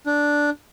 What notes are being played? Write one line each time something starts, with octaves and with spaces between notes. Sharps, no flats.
D4